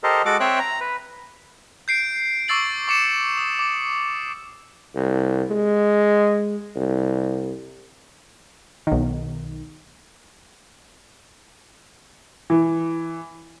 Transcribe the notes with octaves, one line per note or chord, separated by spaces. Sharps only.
G4 A4 A#4 C5 D#5
G#3 F#4 A4 F#5 D6
C4 C5 C#5 E5 G5 F#6
A#5
B4
G6 C7 D7
C#6 D6 E6 A6 C7 F#7
C#6 D6 C#7 E7
D#6
D6
C2
G#3
C2
B1 D#3
E3